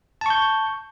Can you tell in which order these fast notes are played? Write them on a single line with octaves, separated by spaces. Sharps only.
A5 C#6 G6